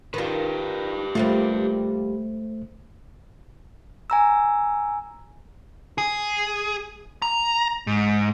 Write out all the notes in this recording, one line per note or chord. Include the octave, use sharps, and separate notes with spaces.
D#3 F4 G4 B4
D#2 G3 A3 F4 C5
G#5 A#5 E6
G#4
A#5
G#2